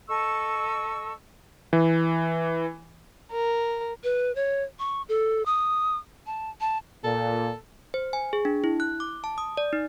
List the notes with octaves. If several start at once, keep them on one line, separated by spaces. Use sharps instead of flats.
A4 D#5 C#6 E6
E3
A#4
B4
C#5
C#6
A4
D#6
A5
A5
A#2 A4
C5
G#5
G#4
D4
E4
F#6
D6
A5
D#6
D5
D#4